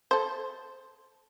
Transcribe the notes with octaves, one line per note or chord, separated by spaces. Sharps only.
A4 C5